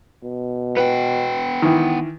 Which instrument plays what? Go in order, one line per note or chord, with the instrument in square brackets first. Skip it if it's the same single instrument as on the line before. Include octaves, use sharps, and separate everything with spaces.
[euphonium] B2
[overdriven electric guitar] B3 G5 [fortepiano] B4
[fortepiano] D#3 E3